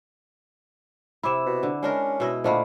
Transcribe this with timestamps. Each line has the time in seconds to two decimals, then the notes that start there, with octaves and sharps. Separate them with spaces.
1.23 C3 E4 B5 D6 E7
1.46 B2
1.63 D3
1.83 G#3 C#4 D4 A#4
2.20 B2 E4 D#5
2.44 A#2 D3 A3 A#3 C5 D#5 B5